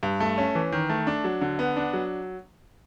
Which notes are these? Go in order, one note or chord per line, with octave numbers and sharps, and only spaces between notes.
G2
A3
C#4
E3
D#3
A3
D4
F#3
D3
B3
D4
F#3